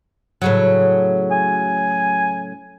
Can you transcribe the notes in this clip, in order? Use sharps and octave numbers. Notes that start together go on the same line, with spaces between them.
A2 C#3 F#3
G#5